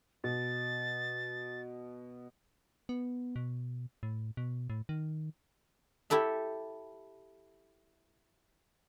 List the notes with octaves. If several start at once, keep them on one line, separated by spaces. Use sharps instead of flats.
B2 A6
B3
B2
A2
B2
A2
D#3
E4 G4 A4 E5